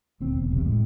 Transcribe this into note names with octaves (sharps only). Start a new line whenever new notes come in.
D#1 D2 C4
E1 B3
E1 B1 E2 C3
A2 G#3